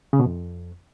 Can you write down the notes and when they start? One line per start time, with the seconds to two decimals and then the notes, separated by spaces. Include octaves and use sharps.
0.13 C#3
0.20 B2
0.26 F2